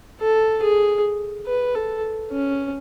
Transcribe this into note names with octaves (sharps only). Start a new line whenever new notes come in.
A4
G#4
B4
A4
C#4